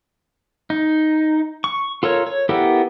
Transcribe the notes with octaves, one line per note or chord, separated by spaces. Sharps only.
D#4
C#6
F4 A4 A#4 C#5
C#5
B3 E4 G4 A4 A#4